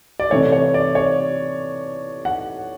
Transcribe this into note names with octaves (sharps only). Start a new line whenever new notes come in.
D5
C3 E3 A3 C#5
C#5
D5
C#5
F#5